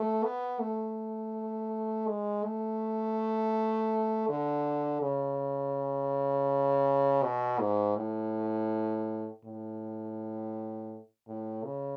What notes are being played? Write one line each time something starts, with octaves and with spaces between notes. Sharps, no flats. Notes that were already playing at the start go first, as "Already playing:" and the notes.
Already playing: A3
B3
A3
G#3
A3
D3
C#3
B2
G#2
A2
A2
A2
C#3